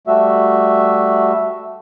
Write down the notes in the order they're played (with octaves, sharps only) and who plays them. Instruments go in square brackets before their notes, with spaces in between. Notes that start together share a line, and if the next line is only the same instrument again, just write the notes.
[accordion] G3 A3 F#4 E5